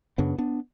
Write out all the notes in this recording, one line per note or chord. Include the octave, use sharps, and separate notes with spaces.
F#2 C#3 B3 D4
B3 D4